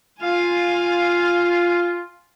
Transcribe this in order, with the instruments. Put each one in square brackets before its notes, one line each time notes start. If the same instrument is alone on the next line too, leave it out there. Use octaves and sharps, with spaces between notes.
[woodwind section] F4 [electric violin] F5 G#5